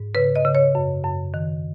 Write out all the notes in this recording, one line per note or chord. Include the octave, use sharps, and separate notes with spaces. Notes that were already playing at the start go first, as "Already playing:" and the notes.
Already playing: G#2
C#3 B4
D#5
C#3
C#5
F#2
F#2
D#3